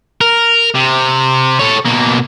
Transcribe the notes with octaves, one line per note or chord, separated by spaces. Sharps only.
A#4
C3
A4 C#5
B2 A#3